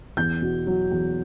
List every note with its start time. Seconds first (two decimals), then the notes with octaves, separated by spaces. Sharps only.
0.17 E2 G6
0.42 B2
0.67 F#3
0.91 E2